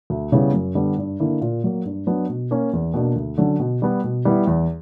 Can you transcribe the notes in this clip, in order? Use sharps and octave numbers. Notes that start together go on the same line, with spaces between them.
D2
C#3 G3 B3 E4
F#2
D3 G3 B3
G2
D3 A#3 E4
A#2
F#3 A#3
G2
F#3 B3 D4
B2
A#3 C#4
E2
B2 A#3 D4
D2
D3 F#3 C#4
B2
G3 B3
B2
G3 B3 E4
E2